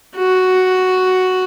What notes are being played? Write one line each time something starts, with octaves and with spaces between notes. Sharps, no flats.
F#4